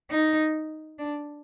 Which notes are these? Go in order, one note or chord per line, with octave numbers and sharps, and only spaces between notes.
D#4
D4